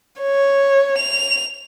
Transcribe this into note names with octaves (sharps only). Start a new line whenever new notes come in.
C#5
F7